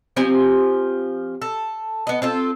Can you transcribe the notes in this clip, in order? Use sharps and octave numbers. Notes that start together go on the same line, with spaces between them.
F3 C4 G4 G#5
A4
B3 D#5
C4 F4 A4